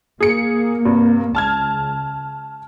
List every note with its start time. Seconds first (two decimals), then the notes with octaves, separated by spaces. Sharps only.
0.20 A#3 G#4 C#7
0.85 G2 C3
1.35 C#2 A5 F6 G#6